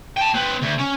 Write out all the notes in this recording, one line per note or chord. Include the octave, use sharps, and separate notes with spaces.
G5 A5
C4 B4
D2
C#4